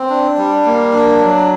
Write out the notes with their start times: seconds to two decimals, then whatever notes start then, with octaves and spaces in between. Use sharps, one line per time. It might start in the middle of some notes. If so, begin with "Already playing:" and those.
Already playing: C4
0.10 D4
0.38 G3
0.65 A#3
0.93 D4
1.20 F#3